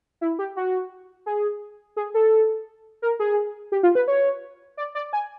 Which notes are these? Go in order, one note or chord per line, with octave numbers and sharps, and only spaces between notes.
E4
G4
F#4
G#4
G#4
A4
A#4
G#4
G4
F4
B4
C#5
D5
D5
G#5